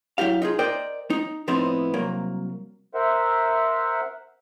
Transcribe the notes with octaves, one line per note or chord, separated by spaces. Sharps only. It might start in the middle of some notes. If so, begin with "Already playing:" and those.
F#3 E4 G4 F5
D#4 F4 G#4
A#4 C5 D5 D#5 G5
D#4
A2 F3 B3 C4 D#4 E4
C2 F#3 A#3
A#4 C5 E5 F#5